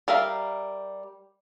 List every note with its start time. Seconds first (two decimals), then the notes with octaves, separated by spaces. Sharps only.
0.08 G3 A#4 E5 F5